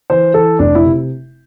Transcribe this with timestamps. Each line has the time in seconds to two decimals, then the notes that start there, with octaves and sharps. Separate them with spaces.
0.10 E3 C5
0.34 E3 A4
0.59 F1 D4
0.75 E4
0.84 C3